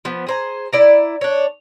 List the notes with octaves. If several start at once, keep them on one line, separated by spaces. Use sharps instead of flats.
F3 B3
G#4 C5 A#5
E4 D5 A#5
D4 C#5